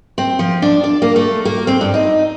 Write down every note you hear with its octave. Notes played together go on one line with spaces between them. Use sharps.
C4
F3
D4
D5
A#3
A3
A#3
C4
G2
D#4